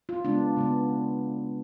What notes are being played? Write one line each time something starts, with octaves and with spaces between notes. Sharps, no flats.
F4
C#3 G#3 B3 D4
C#3 G#3 B3